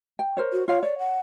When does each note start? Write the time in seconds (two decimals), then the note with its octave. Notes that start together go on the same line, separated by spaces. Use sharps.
0.19 G5
0.37 A#4 C5 C#5
0.52 F#4
0.68 F4 C#5 F5
0.83 C#5 D5
0.99 F#5